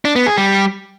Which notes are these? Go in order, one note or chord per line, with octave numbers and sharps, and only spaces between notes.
D4
B3
G#4
G3